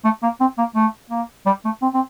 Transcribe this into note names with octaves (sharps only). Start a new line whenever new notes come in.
A3
A#3
C4
A#3
A3
A#3
G3
A3
C4
C4